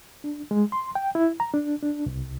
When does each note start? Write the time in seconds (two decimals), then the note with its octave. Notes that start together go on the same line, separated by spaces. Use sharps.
0.24 D4
0.51 G#3
0.72 C6
0.95 G5
1.15 E4
1.40 A#5
1.54 D4
1.83 D4
2.06 C2